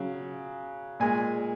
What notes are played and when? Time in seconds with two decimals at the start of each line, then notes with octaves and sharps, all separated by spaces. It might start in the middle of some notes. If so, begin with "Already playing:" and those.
Already playing: C#3 F#3
1.00 A#2 G#3 G#5